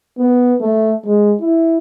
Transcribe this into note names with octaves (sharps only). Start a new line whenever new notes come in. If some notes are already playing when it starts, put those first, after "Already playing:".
B3
A3
G#3
E4